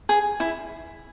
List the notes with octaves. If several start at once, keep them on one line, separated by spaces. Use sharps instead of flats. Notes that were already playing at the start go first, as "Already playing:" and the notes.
G#4
E4